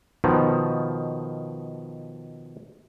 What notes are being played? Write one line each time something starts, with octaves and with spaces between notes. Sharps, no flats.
B2 D#3 F3